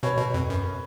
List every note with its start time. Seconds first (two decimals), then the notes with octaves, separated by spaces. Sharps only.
0.03 B2 B4 C#5
0.18 B2
0.34 F2
0.50 F#2